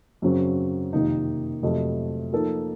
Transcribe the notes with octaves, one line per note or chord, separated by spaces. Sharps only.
F#2 C#3 F#3 C4
F2 C3 D#3 A#3 D#4
F2 C3 F#3 A3
F3 A#3 D#4 A4